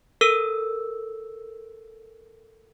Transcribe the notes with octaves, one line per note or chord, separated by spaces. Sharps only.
A4 A#4 E6